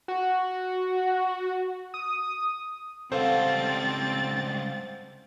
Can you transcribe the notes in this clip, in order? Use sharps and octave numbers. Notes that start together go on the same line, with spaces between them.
F#4
D#6
C#2 G3 C4 A4 C5 F5 F#5 A6